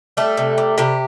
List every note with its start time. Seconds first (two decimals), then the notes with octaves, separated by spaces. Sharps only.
0.17 G3 A3 A4
0.37 C3
0.58 G3
0.78 C3 G3 G4